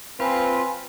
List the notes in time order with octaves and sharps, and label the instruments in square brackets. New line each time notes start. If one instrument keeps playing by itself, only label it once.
[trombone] C4 [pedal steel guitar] F4 [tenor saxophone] B4 [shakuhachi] G#5